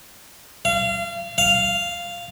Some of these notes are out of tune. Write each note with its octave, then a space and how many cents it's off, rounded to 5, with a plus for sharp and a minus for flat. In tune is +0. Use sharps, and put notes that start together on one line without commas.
F5 -30
F5 -5